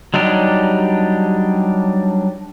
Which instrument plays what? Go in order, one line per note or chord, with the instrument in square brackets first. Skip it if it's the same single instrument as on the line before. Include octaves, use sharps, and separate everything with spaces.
[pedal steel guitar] F#3 G3 D4 D#4 G4